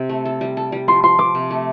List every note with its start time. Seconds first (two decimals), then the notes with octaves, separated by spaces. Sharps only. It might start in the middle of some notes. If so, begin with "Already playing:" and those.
Already playing: C3
0.09 A3
0.25 A4
0.41 G3
0.57 A4
0.72 G3
0.88 F3 C6
1.03 F3 C6
1.18 F3 D6
1.35 C3
1.51 A3